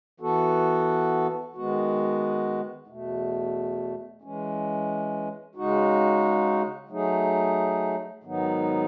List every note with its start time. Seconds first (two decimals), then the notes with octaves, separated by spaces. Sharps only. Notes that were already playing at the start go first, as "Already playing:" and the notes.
0.20 E3 B3 F#4 A4
1.54 D#3 G#3 B3 F#4
2.88 E2 B2 A3
4.22 E3 G#3 C#4
5.55 C#3 G#3 D#4 F#4
6.89 F#3 A3 D#4 G#4
8.23 G#2 D#3 F#3 B3 D#4